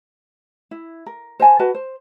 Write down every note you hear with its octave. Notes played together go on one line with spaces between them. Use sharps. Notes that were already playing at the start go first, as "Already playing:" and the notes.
E4
A#4
C5 D#5 G#5 A5
F#4 B4 D#5 A5
C5